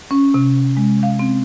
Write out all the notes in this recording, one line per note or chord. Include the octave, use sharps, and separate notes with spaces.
C#4
C3
G#3
F5
C4